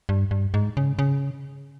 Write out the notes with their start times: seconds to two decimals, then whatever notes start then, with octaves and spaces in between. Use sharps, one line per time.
0.09 G2
0.31 G2
0.54 G#2
0.77 C#3
0.99 C#3